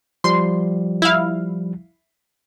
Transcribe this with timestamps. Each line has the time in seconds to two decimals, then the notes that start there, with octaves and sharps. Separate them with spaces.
0.24 F3 G3 C6
1.02 E4 F5